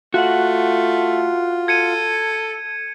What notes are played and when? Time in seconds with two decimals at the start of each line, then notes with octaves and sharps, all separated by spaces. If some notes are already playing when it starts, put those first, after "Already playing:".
0.14 A3 F4 F#4 F#5
1.68 A4 G#6 C#7 D#7